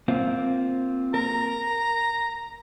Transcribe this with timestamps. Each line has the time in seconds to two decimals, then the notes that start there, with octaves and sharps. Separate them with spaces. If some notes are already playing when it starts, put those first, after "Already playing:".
0.08 A#3 C4 F4
1.14 A#4 A#5